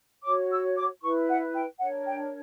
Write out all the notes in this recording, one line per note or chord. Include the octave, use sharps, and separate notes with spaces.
F#4 C#5 D6
E6
D6
E4 B4 C#6
F#5
G5
D4 A#4 C#5 F#5
G5